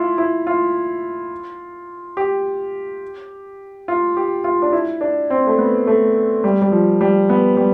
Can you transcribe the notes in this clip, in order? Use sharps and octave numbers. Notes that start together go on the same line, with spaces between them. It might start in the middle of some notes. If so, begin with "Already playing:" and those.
Already playing: E4 F4
E4
F4
G4
F4
G4
F4
D4
E4
D4
C4
A3
B3
A3
G3
G3
F3
G3
B3
G3